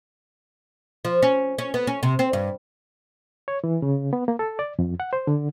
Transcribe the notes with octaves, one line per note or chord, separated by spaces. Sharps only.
F3
C#4
C#4
B3
C#4
C3
C4
G2
C#5
E3
C#3
B3
A#3
A4
D5
F2
F#5
C5
D3